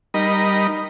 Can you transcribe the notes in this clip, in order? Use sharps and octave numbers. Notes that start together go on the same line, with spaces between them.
G3 D#4 A#4 D#5 B5